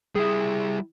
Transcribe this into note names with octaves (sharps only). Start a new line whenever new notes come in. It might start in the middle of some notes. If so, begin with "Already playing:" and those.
G3 E4 G#4